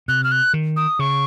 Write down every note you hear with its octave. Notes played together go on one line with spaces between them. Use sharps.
C3 F#6
F6
F#6
D#3
D#6
C#3 C#6